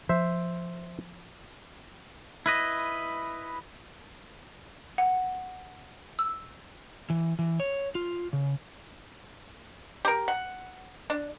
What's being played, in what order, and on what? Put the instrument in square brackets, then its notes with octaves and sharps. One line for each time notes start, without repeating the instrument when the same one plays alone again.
[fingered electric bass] F3 [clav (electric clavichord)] C5 E5
[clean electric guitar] E4 B4 D#5
[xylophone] F#5
E6
[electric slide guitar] E3
E3
C#5
F4
C#3
[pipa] G4 A#4
F#5
D4